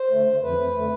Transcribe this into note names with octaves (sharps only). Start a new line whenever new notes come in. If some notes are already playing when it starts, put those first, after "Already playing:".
Already playing: C5
D3 A3
F2 B4
D3 A3